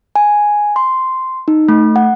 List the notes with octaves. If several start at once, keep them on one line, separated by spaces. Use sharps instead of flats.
G#5
C6
D#4
A3
F#5